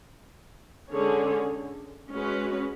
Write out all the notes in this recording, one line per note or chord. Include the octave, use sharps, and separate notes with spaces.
D3 G#3 C#4 G#4 C#5
G#3 C#4 F#4 B4